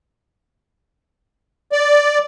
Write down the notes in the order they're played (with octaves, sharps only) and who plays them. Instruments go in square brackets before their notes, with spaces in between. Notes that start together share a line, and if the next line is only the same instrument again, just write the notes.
[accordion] D5